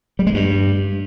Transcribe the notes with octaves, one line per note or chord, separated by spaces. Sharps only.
G3
G#3
G2